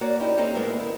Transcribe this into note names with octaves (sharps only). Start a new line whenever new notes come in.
A#3 F#4 C#5 D5
C#4 D#4 E4 G4
A#3 C4 C#4 D#4 G4 A4
D2 A2 G#3 A#3 B3 E5
D#3 E4